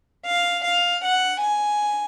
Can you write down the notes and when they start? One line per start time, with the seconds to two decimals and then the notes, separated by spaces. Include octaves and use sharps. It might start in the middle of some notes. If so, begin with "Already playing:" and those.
0.27 F5
0.64 F5
1.04 F#5
1.42 G#5